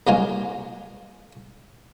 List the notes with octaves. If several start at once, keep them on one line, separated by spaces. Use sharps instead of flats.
C2 B2 F#3 A#3 F4 G#5